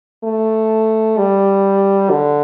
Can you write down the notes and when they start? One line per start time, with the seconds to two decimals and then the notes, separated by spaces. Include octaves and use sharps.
0.24 A3
1.18 G3
2.11 D3